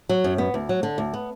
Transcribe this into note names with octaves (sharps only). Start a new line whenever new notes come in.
F#3
F#2
B3
D2
F#3
D3
D2
B3